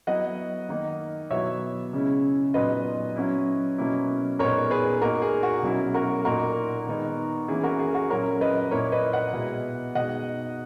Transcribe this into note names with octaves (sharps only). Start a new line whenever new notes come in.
F#3 B3 E4 D#5 F#5
D#3 A#3 D#4
B2 F#3 B3 E4 C#5 E5
C#3 G#3 C#4 E4
A#2 F#3 B3 D#4 B4 D#5
F#3 C#4 E4
B2 F#3 A#3 C#4 E4
A#2 G#3 B3 D#4 A#4 C#5
G#4 B4
A#2 A#3 D#4 F#4 A#4
G#4
F#4
B2 F#3 C#4 E4
F#4 A#4
A#2 A#3 D#4 F#4 A#4
D#3 G#3 B3 D#4
E3 A#3 C#4 E4 G#4
F#4 A#4
G#4
F#4 A#4
A#2 F#3 C#4 E4 A#4 C#5
B4 D#5
A#2 A#3 E4 A#4 C#5
B4 D#5
D#5 F#5
B2 G#3 B3 E4
B2 G#3 D#4 D#5 F#5